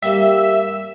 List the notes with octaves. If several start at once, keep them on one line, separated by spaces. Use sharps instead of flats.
G3 A#3 E5